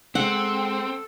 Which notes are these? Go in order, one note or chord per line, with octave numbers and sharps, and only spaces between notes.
G#3 C4 A4 F#5